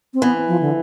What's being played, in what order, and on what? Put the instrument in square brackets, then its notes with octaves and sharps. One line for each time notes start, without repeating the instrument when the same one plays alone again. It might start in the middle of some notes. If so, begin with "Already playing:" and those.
[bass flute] C4
[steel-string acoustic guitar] E3 [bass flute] B3
[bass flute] F3
D3